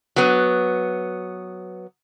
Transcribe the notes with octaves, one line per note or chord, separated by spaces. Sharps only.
F#3 B3